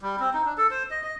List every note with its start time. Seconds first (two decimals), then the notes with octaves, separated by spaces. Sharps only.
0.02 G3
0.20 C4
0.34 D#4
0.45 D4
0.58 A4
0.71 C5
0.91 D#5
1.03 D#5